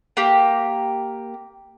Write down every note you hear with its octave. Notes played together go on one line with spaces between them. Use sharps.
A#3 G4